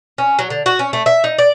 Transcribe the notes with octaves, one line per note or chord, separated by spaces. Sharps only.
C#4
F#3
D3
F#4
C#4
A3
E5
D#4
D5